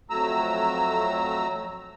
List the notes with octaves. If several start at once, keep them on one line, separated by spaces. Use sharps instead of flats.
F2 F#3 A3 A#5 E6